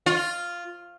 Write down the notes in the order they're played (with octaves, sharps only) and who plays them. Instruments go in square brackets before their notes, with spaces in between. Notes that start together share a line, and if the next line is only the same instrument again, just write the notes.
[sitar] F4